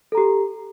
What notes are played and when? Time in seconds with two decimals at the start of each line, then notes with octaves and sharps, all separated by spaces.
0.12 A4
0.15 A#5
0.18 G4